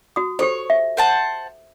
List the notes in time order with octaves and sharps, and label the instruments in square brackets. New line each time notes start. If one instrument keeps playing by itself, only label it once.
[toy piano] F#4 D#6
[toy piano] G4 A4 C5 [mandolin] C#5
[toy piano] E5
[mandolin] C5 F#5 A5